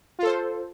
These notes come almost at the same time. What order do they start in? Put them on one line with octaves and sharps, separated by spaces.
F4 A4 C5